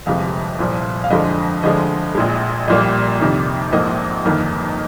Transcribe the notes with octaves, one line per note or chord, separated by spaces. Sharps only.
G1 F2 C3 F3 G#3 F5
C2 A#2 F3
F5
F2 D3 F3 G#3 D#5
D2 D3 F3 G#3 D#5
A#1 A#2 G#3
A#1 A#2 G3 A#3 D#5
F2 C3 D#3
A#1 G#2 F3 A#3 D#5
G1 F2 D#3 A#3